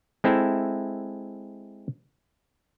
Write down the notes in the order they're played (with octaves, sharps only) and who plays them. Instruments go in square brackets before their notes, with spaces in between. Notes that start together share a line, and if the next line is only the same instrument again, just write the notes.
[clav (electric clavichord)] G#3 C4 E4 A4 E5